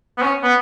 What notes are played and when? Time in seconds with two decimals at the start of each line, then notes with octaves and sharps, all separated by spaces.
0.18 B3
0.22 C#4
0.43 B3